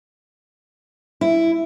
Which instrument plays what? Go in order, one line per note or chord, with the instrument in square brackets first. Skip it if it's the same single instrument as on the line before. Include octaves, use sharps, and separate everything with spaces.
[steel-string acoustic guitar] E4